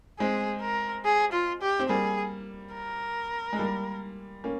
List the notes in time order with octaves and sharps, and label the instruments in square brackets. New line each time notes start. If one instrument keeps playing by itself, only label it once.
[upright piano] G#3 C4 [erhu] G#4
[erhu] A#4
G#4
F4
G4
[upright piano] C4
[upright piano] G3 A#3 [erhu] G#4
[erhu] A#4
[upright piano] G#3
G3 A#3
A#3 C#4